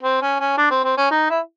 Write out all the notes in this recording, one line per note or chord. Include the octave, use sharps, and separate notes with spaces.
C4
C#4
C#4
D4
C4
C4
C#4
D#4
E4